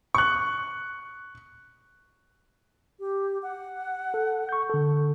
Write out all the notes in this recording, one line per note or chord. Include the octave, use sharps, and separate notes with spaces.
C#6 F#6
G4
F#5
A4
C#6 G6
D3 A4